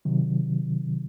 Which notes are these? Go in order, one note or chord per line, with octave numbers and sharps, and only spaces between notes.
C3 D#3 F#3